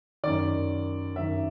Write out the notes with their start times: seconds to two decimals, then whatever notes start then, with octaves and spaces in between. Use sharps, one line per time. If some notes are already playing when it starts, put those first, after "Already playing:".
0.24 F#2 D#3 D5
1.16 F#2 D#3 E5